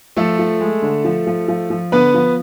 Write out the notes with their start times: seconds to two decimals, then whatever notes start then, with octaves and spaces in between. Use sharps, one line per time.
0.17 F3 A3 A4
0.39 F3
0.60 G#3
0.82 D3
1.05 F3
1.27 F3
1.48 F3
1.70 F3
1.92 D3 B3 B4
2.14 F3